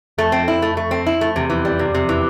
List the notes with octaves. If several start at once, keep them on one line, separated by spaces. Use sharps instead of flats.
F2 A3
C4
F2 E4
A3
A3
C4
E4
A3
E2 C3
F2 E3
E2 G3
C3
C3
E3